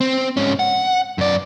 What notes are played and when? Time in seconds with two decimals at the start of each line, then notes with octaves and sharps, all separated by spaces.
0.01 C4
0.37 G#2 C#4
0.59 F#5
1.18 F#2 D5